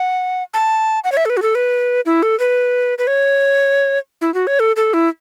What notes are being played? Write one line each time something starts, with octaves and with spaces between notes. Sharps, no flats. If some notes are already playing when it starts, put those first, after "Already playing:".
Already playing: F#5
A5
F#5
C#5
E5
A4
B4
F#4
A4
B4
E4
A4
B4
B4
C#5
E4
F#4
C#5
A4
A4
E4